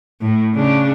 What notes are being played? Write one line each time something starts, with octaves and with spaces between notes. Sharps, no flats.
A2
C#3 D4